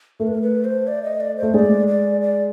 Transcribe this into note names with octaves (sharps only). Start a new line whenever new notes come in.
A3 A#4
B4
A#4
B4
C5
D5
D#5
D5
C5
A3
G#3 D5
D5
D5